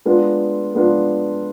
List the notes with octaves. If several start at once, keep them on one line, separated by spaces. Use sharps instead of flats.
G#3 B3 D4 F4
G#3 B3 D4 F4